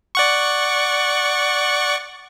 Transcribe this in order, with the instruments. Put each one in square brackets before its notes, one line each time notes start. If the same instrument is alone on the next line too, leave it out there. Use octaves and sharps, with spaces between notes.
[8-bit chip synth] D5 F#5 C#6